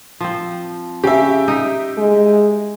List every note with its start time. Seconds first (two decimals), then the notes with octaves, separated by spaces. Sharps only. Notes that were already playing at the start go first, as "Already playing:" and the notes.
0.20 F3 C4
1.04 C#3 G4 E5
1.48 D#4
1.98 G#3